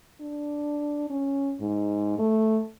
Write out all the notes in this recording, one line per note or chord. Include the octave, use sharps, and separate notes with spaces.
D4
C#4
G#2
A3